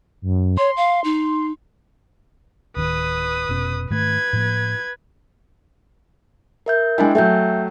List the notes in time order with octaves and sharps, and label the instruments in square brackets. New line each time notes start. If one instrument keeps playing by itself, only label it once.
[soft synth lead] F#2
[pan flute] C#5 [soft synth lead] C6
[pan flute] F5
D#4
[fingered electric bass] D1 D#3 [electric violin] B4 D#6
[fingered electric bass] F1 B2 C#4
[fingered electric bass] G#2 D#3 A3 [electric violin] B4 G#6
[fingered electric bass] A2 F3 A#3
[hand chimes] A#4 E5 G6
[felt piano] G#3 D4 E4 [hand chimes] G5 G#5
[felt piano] F#3 A3 [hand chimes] E5 G5 G6